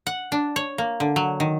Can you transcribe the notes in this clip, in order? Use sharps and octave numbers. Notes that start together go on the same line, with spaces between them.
F#5
D4
C#5
A#3
D3
F#3
D#3